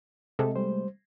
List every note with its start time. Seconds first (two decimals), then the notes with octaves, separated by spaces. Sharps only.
0.39 C3 G#3 A3 A4
0.56 G3 C5